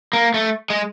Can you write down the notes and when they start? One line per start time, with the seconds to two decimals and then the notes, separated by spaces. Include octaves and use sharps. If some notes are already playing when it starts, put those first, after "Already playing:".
0.13 A#3
0.34 A3
0.70 G#3